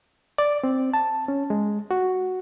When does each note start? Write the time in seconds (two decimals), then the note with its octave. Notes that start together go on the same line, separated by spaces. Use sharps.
0.38 D5
0.64 C4
0.94 A5
1.28 C#4
1.50 G#3
1.91 F#4